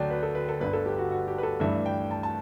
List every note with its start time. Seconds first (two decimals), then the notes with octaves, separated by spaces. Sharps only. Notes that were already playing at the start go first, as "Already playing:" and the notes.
Already playing: D2 D3 F#3 D5 G5 A5
0.11 B4
0.23 A4
0.35 B4
0.49 A4
0.60 G1 G2 D3 B4
0.73 A4
0.86 G4
0.98 F#4
1.11 F#4
1.28 G4
1.38 B4
1.43 A4
1.60 G2 E3 A3 D4 E5
1.86 G5
2.11 A5
2.23 A5